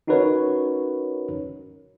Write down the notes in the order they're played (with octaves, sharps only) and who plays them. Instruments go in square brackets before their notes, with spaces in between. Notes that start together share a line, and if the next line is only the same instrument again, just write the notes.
[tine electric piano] C#4 D#4 F#4 A#4 B4 C#5